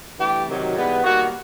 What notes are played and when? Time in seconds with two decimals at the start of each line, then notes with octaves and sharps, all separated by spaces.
0.17 G2 E3 A3 G4
0.46 C3 D#3 F#3
0.75 G#2 E3 G3 B3
1.03 D#3 G3 A#3 F#4